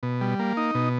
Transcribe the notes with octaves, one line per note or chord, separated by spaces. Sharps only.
B2
G3
A#3
D#4
B2